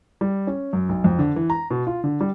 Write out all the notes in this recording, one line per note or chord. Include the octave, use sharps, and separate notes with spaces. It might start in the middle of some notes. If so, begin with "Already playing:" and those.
G3
C#4
F#2
B1
F2
D3
E3
A#5
B2
F4
D3
G3